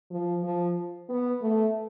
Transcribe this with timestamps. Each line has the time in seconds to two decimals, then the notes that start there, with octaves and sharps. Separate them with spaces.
0.11 F3
0.43 F3
1.09 B3
1.42 A3